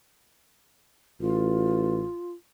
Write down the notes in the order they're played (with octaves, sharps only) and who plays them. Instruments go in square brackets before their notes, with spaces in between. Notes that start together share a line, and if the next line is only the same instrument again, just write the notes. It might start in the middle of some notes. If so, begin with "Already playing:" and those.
[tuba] A1 [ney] F4